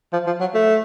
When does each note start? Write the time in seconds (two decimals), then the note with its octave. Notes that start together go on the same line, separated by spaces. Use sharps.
0.13 F3
0.26 F3
0.40 F#3
0.55 A3